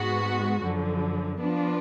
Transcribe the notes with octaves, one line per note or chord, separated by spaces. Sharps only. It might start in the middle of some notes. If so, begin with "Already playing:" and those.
Already playing: G#2 G#3 B3 F#4
F#2 D3 F3
F3 B3 D4 F4